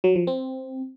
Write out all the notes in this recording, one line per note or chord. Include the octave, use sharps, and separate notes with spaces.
F#3
F3
C4